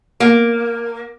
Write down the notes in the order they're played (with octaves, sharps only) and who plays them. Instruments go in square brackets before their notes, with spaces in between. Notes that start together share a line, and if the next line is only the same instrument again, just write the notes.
[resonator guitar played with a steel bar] A#3